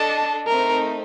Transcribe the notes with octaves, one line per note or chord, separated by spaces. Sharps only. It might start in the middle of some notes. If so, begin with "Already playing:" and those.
Already playing: D4 A4 D#5 A5
A3 C4 D#4 A#4